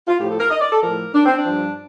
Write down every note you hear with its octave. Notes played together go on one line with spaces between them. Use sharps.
F4
A2 F3 G4
A4
A#4
D#5
D5
A4
A2 F3 A#4
D4
C4
D4
G2 F3